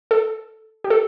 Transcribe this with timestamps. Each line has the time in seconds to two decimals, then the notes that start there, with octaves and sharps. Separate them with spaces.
0.11 A4
0.84 G4
0.90 A4